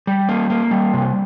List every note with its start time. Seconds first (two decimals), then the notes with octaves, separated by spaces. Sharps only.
0.07 G3
0.29 A#3
0.50 A#3
0.71 G3
0.94 C3